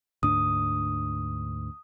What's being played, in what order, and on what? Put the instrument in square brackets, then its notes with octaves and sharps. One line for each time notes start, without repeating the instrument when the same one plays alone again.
[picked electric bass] D2 G#2 D4 [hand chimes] D#6